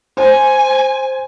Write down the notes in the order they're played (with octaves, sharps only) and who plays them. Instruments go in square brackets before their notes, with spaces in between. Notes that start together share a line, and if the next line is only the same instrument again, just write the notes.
[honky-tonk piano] C5 [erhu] G#5